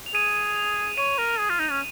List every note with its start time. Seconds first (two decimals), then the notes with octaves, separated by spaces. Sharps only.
0.06 F7
0.14 G#4 D#7
0.56 F7
0.97 C#5 D#7
1.18 A#4
1.40 G#4
1.49 F4
1.60 D#4
1.70 C#4